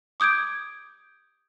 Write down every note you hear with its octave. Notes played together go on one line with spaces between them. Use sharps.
D6 D#6 G6 G#6 D7